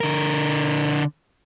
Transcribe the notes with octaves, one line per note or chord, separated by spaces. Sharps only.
D3 A#4